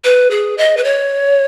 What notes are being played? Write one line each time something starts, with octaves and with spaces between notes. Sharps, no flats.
B4
G#4
D#5
B4
C#5